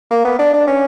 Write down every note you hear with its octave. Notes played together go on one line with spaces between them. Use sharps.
A#3
B3
D4
D4
C#4